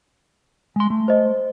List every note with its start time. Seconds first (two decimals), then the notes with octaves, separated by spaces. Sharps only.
0.76 G#3 C6
0.90 A3
1.08 C5 D#5